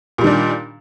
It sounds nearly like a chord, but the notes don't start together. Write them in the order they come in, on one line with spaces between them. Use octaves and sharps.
A#2 G3 D#3 D4